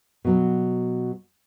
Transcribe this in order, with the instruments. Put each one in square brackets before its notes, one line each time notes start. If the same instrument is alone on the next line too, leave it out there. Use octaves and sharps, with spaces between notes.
[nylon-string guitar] B2 F#3 F#4